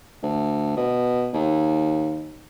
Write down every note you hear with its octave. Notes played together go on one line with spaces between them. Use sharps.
D2
B2
D#2